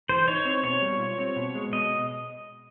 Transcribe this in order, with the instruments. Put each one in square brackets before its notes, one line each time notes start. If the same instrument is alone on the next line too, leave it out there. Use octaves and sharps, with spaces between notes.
[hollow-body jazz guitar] E3 [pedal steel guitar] C5
[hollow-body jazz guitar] D#4 [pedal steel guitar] C#5
[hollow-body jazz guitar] C4
[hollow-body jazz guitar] B2 [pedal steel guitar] C#5
[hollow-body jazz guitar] G3
F4
C4
B2
G#3
[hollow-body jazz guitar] B2 [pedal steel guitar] D#5